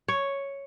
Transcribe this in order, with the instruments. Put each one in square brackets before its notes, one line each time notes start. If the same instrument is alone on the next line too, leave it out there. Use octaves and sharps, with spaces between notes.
[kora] C#5